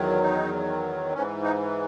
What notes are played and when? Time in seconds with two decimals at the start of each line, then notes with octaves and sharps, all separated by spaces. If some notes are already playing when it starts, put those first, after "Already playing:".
Already playing: E2 D#3 F#3
0.23 D#4
1.13 G#2 E3 C#4
1.43 D#4